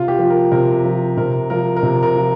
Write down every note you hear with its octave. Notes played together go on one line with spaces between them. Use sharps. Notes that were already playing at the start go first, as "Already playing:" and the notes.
Already playing: C3 F4
G4
F3
A#4
C3 A#4
F3
C3 A#4
F3 A#4
A#4
C3
A#4
F3